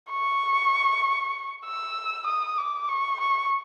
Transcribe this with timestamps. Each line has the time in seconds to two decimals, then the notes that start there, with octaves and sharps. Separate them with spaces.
0.10 C#6
1.66 E6
2.27 D#6
2.58 D6
2.89 C#6
3.20 C#6